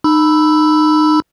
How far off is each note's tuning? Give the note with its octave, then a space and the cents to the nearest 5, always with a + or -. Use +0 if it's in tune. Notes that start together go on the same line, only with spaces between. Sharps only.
D#4 -30 B5 +0 E6 +0